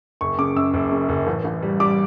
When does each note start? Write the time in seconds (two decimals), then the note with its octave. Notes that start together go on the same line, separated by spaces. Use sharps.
0.21 F#1 C#6
0.39 C#3 D6
0.56 F#2 E6
0.74 F#1
0.92 C#3
1.09 F#1
1.27 A1
1.44 A1
1.62 G3
1.80 G3 D6